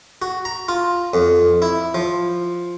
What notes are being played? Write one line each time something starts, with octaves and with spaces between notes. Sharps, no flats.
F#4
A#5
F4
F2
E4
F3